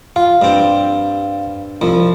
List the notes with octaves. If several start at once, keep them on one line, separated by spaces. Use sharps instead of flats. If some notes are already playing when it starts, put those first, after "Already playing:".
F4 F5
G2 C4
C2 F3